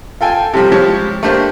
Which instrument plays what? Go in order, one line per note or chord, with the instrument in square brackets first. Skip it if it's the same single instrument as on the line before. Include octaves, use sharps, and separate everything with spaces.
[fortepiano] F4 A4 G5 G#5
C3 F3 G3
F3 G#3 G4 C#5
A3 A#3 D4 G4 C5